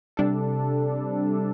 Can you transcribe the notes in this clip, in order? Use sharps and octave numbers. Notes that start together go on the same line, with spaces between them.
C3 G3 D4 A4